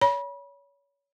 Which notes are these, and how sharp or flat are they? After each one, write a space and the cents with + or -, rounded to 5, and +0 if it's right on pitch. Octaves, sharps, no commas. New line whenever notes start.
C#5 +30 B5 -30